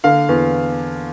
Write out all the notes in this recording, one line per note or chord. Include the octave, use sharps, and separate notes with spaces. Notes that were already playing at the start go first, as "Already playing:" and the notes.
D3 F5
E2